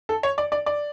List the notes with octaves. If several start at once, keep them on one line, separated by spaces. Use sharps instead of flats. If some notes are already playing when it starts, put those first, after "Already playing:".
A4
C#5
D5
D5
D5